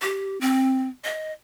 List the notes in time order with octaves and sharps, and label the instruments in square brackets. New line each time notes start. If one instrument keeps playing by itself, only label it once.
[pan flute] G4
C4
D#5